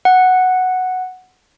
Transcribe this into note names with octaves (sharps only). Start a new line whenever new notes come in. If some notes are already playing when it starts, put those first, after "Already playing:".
F#5